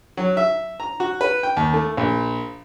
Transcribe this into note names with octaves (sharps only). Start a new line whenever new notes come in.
F#3
E5
A#5
F#4
B4
G5
D#2
A3
A#1